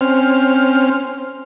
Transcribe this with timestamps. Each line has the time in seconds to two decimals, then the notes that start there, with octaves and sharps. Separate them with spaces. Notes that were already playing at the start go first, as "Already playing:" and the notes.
0.01 C4 C#4 C5 F6